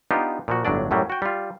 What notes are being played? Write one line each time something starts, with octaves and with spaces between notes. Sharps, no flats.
B3 D4 D#4 F4 G4
A#2 F3 F#4
G1 A2 F#3 D4 D5
F#2 A2 F#3 G3
F#4 G5
G3 F4